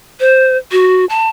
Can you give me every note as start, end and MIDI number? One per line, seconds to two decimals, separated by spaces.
0.20 0.57 72
0.72 1.05 66
1.09 1.29 81